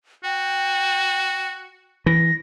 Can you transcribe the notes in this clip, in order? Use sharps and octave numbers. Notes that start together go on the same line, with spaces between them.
F#4 G5
E3 A#6